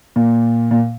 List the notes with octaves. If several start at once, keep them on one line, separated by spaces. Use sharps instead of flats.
A#2
A#2